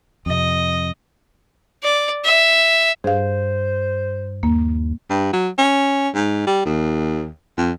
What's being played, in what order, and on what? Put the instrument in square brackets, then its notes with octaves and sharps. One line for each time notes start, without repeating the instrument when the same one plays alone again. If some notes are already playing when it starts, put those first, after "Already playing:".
[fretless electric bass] F2 C3 [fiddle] D#5
[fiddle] D5
E5
[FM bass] G2 [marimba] G#4 F5 [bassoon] C5
[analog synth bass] D#2 [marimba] A#3
[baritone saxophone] G2
F#3
C#4
G#2
G3
D#2
F2